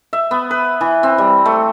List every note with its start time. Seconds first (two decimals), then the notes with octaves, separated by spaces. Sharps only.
0.13 E5
0.31 B3
0.51 B4
0.81 E3
1.03 C4
1.18 G3
1.46 A3